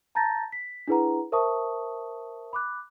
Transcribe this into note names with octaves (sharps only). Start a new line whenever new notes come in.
A5 A#5 G6 A6 A#6
B6
D4 E4 G#4 B4 F#5 A#5
A#4 C5 E5 A5 C#6 D#6
B5 D6 F#6